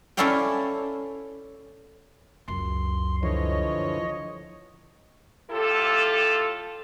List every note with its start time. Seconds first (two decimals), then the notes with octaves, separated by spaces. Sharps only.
0.17 C#4 E4 A4 D5 F5 G5
2.48 C#2 F#2 C6
3.23 D3 E3 F3 C#5 D#5
5.50 A2 F4 G4 A4